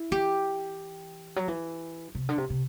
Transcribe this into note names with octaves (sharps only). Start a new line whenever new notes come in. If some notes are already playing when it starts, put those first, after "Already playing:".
Already playing: E4
E3 G4
F#3
E3
C3
D3
C3
C3